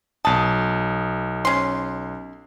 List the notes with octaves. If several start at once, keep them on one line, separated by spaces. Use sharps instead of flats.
B1 A5 D#6
C#4 C6